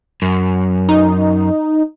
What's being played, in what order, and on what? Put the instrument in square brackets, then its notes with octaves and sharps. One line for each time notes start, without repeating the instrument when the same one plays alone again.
[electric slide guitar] F#2
[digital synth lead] D#4